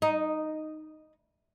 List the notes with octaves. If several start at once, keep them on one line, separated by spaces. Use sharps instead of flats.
D#4